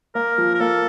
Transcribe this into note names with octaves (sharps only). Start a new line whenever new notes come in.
A#3 A#4
F3
A#4
A#3 A4